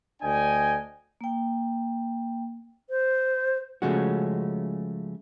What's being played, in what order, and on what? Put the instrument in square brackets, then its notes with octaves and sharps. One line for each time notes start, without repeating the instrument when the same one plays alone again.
[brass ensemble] D2 D4 D#5 G5 G#5
[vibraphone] A#3 G5
[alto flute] C5
[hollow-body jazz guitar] C#3 F3 G#3 A3 C#4 F#4